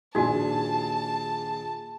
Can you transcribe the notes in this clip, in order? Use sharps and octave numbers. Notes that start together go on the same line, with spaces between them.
D#1 A#1 D4 D#4 F#4 G#4 G#5 A5